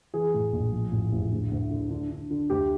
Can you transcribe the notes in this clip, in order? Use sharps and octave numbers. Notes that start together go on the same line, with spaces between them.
E3 G#4
A2
A#1
F3
A1
A1
D2
D2
D3
D3
D3
D3
D2 G4